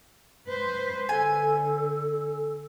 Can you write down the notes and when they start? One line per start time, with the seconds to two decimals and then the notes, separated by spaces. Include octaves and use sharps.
0.47 B4 C5
1.09 D3 A4 G#5